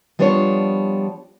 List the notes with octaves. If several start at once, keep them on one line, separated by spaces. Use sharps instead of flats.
F3 G3 B3 D4 C5 C#5